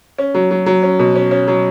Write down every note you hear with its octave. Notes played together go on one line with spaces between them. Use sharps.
C#4
F#3
F#3
F#3
C#4
B2
C#4
C#4
F#3